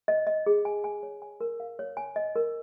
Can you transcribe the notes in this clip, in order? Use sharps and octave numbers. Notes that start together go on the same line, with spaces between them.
D#5
D#5
G#4
G#5
G#5
C#5
G#5
A#4
F5
C#5
G#5
D#5
A#4